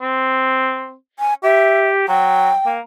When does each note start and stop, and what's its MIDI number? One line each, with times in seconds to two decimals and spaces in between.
0.02 0.94 60
1.19 1.34 80
1.44 2.04 67
1.44 1.87 76
2.08 2.50 54
2.08 2.70 79
2.66 2.80 58